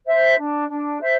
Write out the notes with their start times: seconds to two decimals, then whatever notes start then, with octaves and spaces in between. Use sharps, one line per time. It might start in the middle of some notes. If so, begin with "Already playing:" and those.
0.06 C5 E5
0.38 D4
0.69 D4
1.01 C5 E5